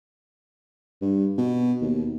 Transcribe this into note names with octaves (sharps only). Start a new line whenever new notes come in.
G2
B2
D#2